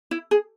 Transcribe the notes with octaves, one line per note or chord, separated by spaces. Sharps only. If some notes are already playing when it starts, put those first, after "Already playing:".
E4
G#4